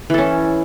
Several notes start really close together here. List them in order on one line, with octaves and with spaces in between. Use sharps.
E3 A4 C#4